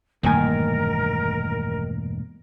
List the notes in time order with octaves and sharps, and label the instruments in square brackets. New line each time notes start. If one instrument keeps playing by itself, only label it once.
[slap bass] E1 G2 A3 [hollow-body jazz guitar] A#2 G#5 [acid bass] D#3 [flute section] A#4